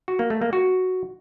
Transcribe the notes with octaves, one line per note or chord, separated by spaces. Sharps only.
F#4
A#3
A3
A#3
F#4